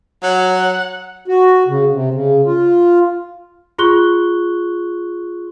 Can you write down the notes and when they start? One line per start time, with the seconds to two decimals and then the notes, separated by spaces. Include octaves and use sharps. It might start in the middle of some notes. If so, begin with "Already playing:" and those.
0.23 F#3 C#5 F#5
1.28 F#4
1.68 C#3
1.93 C3
2.14 C#3
2.46 F4
3.78 F4 G#4 C6 C#6 F#6 G7